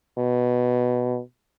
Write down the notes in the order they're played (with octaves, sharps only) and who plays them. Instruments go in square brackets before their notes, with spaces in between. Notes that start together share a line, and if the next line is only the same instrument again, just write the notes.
[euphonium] B2